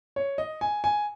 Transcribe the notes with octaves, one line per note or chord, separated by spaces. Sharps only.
C#5
D#5
G#5
G#5